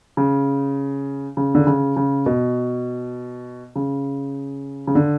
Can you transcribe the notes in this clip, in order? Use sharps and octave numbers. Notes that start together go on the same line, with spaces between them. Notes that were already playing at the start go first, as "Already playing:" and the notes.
C#3
C#3
D3
C#3
C#3
B2
C#3
C#3
D3